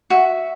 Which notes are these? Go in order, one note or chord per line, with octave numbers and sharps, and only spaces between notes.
F#4 E5